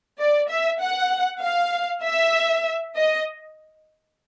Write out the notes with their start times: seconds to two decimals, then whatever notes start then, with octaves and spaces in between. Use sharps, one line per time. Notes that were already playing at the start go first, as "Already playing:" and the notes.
0.19 D5
0.49 E5
0.80 F#5
1.41 F5
2.03 E5
2.96 D#5